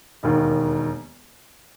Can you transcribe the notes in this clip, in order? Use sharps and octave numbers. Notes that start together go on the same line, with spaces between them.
E1 D#2 D#3